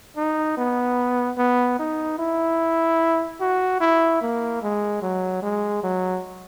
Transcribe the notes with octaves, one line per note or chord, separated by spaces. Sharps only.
D#4
B3
B3
D#4
E4
F#4
E4
A#3
G#3
F#3
G#3
F#3